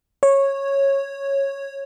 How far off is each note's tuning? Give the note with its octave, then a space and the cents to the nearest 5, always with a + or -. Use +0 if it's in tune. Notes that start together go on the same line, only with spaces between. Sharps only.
C#5 -10